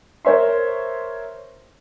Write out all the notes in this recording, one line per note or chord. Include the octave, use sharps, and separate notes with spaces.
A#4 C5 C#5 E5 C6